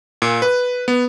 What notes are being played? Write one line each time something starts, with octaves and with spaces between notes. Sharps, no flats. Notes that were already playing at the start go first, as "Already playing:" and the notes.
A#2
B4
B3